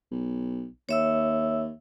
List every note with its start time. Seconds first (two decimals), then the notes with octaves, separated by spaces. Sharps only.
0.11 B1
0.89 D#2 C#5 E5 E6